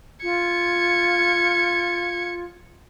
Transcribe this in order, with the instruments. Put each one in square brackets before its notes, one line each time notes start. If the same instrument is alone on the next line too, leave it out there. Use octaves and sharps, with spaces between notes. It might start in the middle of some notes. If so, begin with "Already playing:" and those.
[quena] F4 [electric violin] G#6 C#7